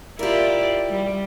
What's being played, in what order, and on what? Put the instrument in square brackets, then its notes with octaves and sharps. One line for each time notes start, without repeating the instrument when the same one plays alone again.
[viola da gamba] E4 F4 D5 [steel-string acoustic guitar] G4 A#4
[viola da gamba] G3